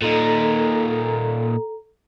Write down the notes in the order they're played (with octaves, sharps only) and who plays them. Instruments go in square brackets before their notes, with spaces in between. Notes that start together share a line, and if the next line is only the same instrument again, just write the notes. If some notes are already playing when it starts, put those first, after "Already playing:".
[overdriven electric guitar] A#2 D#4 [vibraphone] A4 A#5